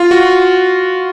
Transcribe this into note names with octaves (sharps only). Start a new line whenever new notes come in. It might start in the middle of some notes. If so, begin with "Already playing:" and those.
Already playing: F4
F#4